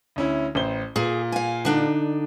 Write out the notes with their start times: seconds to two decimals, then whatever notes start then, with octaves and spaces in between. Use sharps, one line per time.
0.16 D2 C#4 E4
0.55 A1 C5 G7
0.96 A#2 G#4
1.32 F5 G#5
1.65 D3 D4 D#4